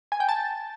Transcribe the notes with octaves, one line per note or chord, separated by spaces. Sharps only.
G#5
G5
A5